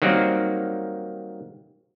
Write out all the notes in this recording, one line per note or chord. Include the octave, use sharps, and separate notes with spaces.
D#3 F#3 G3 A#3 C4